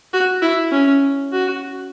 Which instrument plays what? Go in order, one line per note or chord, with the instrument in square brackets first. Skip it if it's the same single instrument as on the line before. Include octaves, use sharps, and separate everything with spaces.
[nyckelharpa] F#4
E4
C#4
F#4